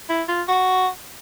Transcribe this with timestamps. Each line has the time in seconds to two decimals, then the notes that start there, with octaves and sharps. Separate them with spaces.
0.09 E4
0.28 F4
0.48 F#4